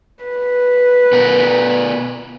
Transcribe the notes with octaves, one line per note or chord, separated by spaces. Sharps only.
B4
B2 B3 A#4